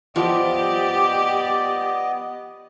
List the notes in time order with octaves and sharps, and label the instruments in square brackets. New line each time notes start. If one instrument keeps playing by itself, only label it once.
[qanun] F3 [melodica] B3 D#5 [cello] G4 [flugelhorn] D5